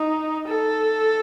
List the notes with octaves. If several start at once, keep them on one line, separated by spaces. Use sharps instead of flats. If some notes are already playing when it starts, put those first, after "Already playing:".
Already playing: D#4
A4